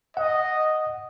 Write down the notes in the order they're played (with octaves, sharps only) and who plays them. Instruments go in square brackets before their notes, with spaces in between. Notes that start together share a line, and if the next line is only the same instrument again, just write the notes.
[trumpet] D#5 [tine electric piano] F#5